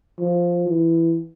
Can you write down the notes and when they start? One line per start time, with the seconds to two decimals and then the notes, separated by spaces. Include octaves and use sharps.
0.20 F3
0.68 E3